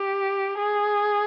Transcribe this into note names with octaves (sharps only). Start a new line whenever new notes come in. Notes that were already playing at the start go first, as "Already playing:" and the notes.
Already playing: G4
G#4